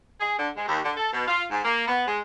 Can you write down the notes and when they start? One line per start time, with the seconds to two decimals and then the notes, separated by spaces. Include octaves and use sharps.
0.21 G#4
0.39 D3
0.57 G#3
0.68 D#2
0.84 D3
0.97 A4
1.13 B2
1.28 F4
1.51 G#2
1.64 A#3
1.88 B3
2.08 G#3